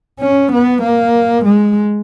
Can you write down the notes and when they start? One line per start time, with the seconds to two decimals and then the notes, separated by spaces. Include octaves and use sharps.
0.20 C#4
0.53 B3
0.83 A#3
1.46 G#3